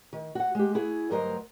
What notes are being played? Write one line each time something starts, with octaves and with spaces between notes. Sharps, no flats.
D#3
F#4 F#5
G#3 G4
E4 F#4 G#4
D2 G2 F#3 A#4 C5 D#5